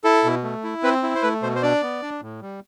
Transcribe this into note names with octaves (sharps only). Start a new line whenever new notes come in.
E4 A4
B2
A3
E4
C4 B4
E4
C5
A3 B4
B2 C5
C5
D4 D5
B3
D4
A2
G3